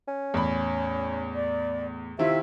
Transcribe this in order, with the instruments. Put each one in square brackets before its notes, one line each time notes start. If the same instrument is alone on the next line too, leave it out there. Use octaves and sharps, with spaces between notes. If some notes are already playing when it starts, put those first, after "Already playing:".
[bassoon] C#4
[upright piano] E2 A2 B5
[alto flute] D5
[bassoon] C3 [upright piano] D#3 E4 F4 [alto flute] E5